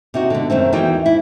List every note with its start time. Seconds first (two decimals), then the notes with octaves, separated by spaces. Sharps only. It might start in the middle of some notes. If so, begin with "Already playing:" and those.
0.14 C3 D#4 F#4
0.30 B2 D3
0.50 F#2 D#3 A3 C4
0.73 E2 E3 D#4 F#4 G5
1.06 E4